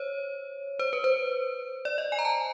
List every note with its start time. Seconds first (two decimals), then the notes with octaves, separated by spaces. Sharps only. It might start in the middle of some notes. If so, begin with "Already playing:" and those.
Already playing: C5 C#5
0.79 C5
0.93 B4
1.04 C5
1.85 D5
1.98 D#5
2.12 G#5
2.19 A#5
2.25 A5